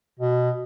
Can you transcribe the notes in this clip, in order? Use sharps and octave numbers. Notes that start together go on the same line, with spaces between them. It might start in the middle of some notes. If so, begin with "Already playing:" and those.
B2